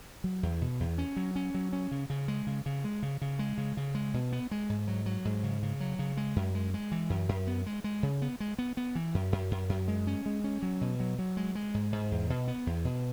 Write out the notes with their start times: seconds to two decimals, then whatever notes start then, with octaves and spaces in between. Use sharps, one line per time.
0.24 F#3
0.43 E2
0.61 B2
0.80 E2
0.98 C#4
1.16 F#3
1.36 C#4
1.54 F#3
1.73 C#4
1.91 C#3
2.10 C#3
2.28 G#3
2.47 C#3
2.66 C#3
2.84 G#3
3.03 C#3
3.22 C#3
3.39 G#3
3.58 C#3
3.77 C#3
3.95 G#3
4.14 B2
4.32 B3
4.51 G#3
4.70 G#2
4.88 F#3
5.06 F#3
5.25 G#2
5.43 C#3
5.63 C#3
5.80 F#3
5.99 C#3
6.17 G#3
6.36 F#2
6.55 G#3
6.74 G#3
6.92 E3
7.10 F#2
7.29 F#2
7.47 B3
7.66 G#3
7.84 G#3
8.03 C#3
8.22 B3
8.40 G#3
8.58 B3
8.77 B3
8.95 E3
9.14 F#2
9.32 F#2
9.51 F#2
9.69 F#2
9.88 G#3
10.07 C#4
10.26 G#3
10.44 C#4
10.62 F#3
10.81 B2
11.00 F#3
11.19 F#3
11.37 G#3
11.55 G#3
11.74 G#2
11.92 G#2
12.12 E2
12.30 B2
12.48 B3
12.67 E2
12.85 B2